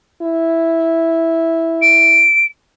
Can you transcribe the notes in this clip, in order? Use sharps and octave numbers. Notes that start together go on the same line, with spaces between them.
E4
D7